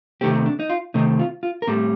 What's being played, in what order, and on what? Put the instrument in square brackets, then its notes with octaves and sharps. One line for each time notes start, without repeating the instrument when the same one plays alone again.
[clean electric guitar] C3 D#3 A3 C4 G4
D4
D#4
F4
C3 D#3 A3 C4 D#4
F4
F4
A#4
A2 G3 C4 A4